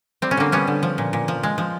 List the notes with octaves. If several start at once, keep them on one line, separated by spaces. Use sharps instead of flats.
G3 C4
C#4
D3 A#3 C4
G3 B3 C#4
D3
F3
A#2
A#2
F3
G#3
F3